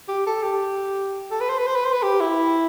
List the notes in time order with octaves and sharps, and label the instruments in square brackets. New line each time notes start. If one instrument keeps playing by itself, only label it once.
[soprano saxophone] G4
A4
G4
A4
B4
C5
B4
C5
B4
C5
B4
G4
E4